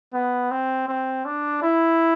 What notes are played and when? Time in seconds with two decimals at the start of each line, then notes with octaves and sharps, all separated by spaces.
0.14 B3
0.51 C4
0.88 C4
1.25 D4
1.62 E4